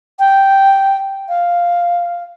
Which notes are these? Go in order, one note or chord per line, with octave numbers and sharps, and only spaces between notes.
G5
F5